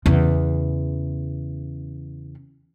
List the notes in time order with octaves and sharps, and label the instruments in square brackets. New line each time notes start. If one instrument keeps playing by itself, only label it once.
[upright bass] E2 C#3